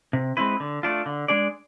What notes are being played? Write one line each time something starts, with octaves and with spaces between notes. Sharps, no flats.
C3
G#3 C4 E4 B4
D3
A3 D4 F4
D3
G#3 D4 G#4 D5